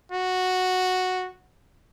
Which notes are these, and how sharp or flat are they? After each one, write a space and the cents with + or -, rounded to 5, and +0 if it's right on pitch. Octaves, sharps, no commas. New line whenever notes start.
F#4 -5